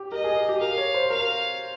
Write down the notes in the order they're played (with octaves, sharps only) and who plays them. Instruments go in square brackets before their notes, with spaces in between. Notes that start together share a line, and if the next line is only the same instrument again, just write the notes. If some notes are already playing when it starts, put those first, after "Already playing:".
Already playing: [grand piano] G4
[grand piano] A#4 [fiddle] D#5
[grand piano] G#4
G#4
G4
[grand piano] A#4 [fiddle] F5
[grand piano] C#5
C5
[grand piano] A#4 [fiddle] F5